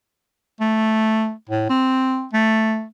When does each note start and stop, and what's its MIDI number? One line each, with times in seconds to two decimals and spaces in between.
0.61 1.32 57
1.49 1.68 45
1.69 2.26 60
2.33 2.84 57